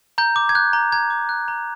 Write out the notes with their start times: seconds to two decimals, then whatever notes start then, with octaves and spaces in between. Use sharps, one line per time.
0.18 A#5 G6
0.36 D6
0.49 G#6
0.55 F#6 G6
0.73 A#5
0.92 A#5 G#6
1.10 D6
1.29 F#6
1.48 A#5